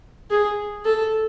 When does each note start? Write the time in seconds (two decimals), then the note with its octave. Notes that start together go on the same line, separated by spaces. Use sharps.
0.31 G#4
0.85 A4